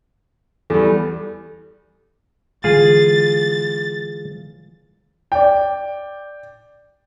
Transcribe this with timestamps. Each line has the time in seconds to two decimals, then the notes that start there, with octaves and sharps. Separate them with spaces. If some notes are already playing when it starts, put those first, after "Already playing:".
0.70 E2 G3 A4
2.64 D3 E3 G#3 F4 G#4 A6
5.32 D5 G5